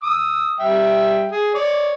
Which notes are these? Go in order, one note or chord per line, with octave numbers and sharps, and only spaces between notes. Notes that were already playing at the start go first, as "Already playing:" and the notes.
D#6 E6
G3 E5 G5
G#4
C#5 D5